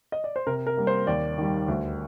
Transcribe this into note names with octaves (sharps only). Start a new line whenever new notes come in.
D#5
D5
C5
C3 A#4
A#4
G3 A#3
C5
D#2 D5
D#3 G3
D2